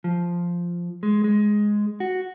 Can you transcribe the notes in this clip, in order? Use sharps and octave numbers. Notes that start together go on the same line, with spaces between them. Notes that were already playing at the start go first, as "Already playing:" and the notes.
F3
G#3
G#3
F#4